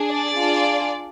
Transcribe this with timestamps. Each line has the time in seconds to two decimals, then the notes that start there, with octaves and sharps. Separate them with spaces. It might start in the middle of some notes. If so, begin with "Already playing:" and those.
Already playing: D4 G#4
0.10 D5
0.38 D4 F4 G#4